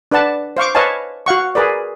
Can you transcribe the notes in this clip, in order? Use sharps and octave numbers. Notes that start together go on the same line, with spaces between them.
D4 B4 D5 F#5 A5
C5 F5 C#6 D6
B4 C#5 D#5 F5 G#5 A5
F#4 F5 F#5 C#6
G#4 A#4 B4 D5